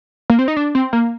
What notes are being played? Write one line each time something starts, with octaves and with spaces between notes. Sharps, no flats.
A#3
C4
D#4
D4
C4
A#3